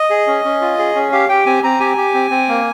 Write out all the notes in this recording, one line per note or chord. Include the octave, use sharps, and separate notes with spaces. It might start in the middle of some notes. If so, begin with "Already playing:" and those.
Already playing: D#5
G#4
C#4
C#4
F4
G#4
C#4
G4 F5
G4 G5
C4 G#5
C4 A#5
G4 G#5
G4
C4
C4
A#3